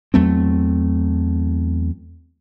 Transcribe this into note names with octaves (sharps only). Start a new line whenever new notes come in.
E2 F#3 A3 C4